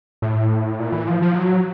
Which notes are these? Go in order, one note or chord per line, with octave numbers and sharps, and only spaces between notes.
A2
A#2
E3
F3
F3
F#3